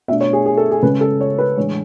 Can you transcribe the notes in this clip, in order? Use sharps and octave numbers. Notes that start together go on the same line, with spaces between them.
B2 A3 D4 E5
C#5
G#4
G#4
A4
G#4
C#3 G#3 C#4 B4
A4
C#5
B4
A2 E3 G#3 D4 C#5